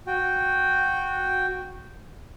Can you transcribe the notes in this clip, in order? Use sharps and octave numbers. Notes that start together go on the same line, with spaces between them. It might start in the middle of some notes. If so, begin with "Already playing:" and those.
F#4 G5